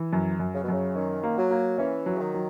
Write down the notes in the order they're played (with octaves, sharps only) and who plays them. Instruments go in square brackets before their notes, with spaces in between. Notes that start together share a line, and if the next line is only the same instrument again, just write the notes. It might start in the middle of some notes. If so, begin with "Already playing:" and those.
Already playing: [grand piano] E3
F#2
F#2
[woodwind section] C#3
B2
[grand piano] F#2 [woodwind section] C#3
[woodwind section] D#3 [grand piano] C#4
[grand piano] A#3
[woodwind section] F#3
[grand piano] A#3
[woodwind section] E3 [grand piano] C#4
[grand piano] F#3
[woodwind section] C#3
D#3
[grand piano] F#3